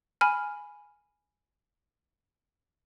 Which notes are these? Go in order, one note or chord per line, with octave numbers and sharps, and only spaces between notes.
G#5 B5 F6